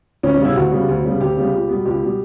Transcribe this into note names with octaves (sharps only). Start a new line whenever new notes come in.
D2 C#4
C#4
C#3 G3 B3 E4
D2 F#4
C#3 G3 B3
D2
C#3 G3 B3
D2 G4
C#3 G3 B3
C#2
B2 G3 B3
C#2 G4
B2 G3 B3